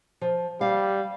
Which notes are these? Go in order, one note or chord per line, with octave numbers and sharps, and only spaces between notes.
F3
G3 F5